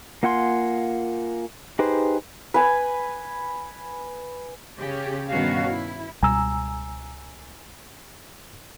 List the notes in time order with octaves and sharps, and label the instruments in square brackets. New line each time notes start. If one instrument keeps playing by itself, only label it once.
[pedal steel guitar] A#3 F4 F#5 G#5 C6
D#4 G4 G#4 B4 C5
[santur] B4 G#5
[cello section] C#3 C#4 G4
G2 B2 D#3 C#4 F#4 F5
E4
[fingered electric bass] C#2 B2 G3 [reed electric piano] G#5 A#5 E6